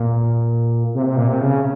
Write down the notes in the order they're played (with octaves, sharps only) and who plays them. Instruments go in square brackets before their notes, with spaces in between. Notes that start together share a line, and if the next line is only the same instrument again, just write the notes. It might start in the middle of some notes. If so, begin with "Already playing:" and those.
Already playing: [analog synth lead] A#2
C3
C3
A#2
C3
C#3